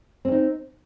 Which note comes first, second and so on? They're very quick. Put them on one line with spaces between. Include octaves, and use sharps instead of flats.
C4 C#4 D#4